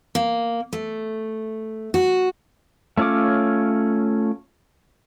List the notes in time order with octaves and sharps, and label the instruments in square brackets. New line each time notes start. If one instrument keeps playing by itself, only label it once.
[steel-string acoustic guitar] A#3
A3
F#4
[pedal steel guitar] A3 C#4 F4 C#5 D6